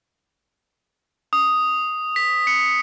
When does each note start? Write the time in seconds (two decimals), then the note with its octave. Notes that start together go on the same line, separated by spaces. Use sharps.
1.33 D#6
2.16 B6
2.47 C#7